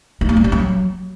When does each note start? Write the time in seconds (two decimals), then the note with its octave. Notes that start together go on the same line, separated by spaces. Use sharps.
0.21 D#4
0.29 A#3
0.37 G3
0.44 C#4
0.52 F#3